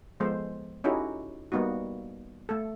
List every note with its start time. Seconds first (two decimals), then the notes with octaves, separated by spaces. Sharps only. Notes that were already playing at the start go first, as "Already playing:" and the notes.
0.20 F3 G#3 B3 A4 C5
0.84 C#4 D#4 E4 F#4 G4 A4
1.52 G3 A#3 B3 D#4 F#4
2.49 A3 A4